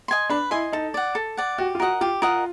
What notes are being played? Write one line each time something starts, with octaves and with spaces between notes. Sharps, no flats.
D#5 G#5 C6
D4 B4
E4 D#5 G#5 C6
D#4 A4
D5 F#5
A4
D5 F#5
F#4 G4
F4
F#4 A#4 D#5 F#5
F4 G4
F4 A#4 D#5 F#5